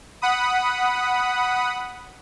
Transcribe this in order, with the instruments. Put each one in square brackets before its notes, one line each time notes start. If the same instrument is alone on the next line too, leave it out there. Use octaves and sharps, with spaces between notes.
[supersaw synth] F#5 B5 D#6